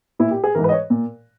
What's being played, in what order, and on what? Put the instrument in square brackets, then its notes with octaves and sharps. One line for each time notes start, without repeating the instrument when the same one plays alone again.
[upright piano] A#2 E4
G4
G#4
G#2 E3 A#4
B4
D#5
C#5
A#2